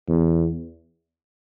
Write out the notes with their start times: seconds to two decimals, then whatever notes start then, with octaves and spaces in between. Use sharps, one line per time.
0.08 E2